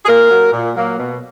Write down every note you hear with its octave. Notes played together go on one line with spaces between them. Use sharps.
G#4
A#2 A#3 A#4
F#3 A#3
A#2
F#3 A#3
B2